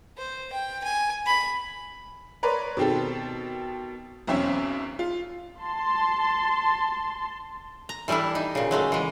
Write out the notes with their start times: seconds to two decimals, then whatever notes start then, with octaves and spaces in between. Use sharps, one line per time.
0.18 C5
0.53 G5
0.84 G#5
1.26 B5
2.43 A#4 B4 C#5 D5 C6
2.77 B2 D#3 C4 G4 A4
4.27 B1 E2 C4 C#4 E5
4.99 F4
5.62 A5 C6
7.89 A#5
8.08 E3 G3 A3 D4 E4
8.35 D#4
8.55 A#2 C#3
8.71 F#3 G#3 A3
8.92 E3 G#3